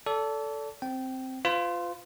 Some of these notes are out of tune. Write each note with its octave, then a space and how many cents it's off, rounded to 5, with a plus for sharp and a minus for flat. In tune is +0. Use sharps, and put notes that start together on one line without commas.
A4 +0 D5 -35
C4 +0 G5 -20
F4 +0 B4 +45